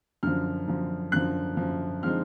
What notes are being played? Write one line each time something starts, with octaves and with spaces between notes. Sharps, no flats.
F#2 D3 F3 F6
F#2 D3 F3
F#2 D3 F3 F#6
F#2 D3 F3
D3 F3 G#3 C4 D#4 F6